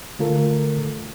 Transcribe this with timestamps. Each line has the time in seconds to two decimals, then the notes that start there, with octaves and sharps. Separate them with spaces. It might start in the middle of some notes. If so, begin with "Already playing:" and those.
0.19 D3 A3 F4 A4 A#4